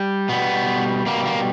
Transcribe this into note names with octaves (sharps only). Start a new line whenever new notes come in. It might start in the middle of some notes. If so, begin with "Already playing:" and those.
Already playing: G3
B2 G3 B3
B2 G3 A#3
A#3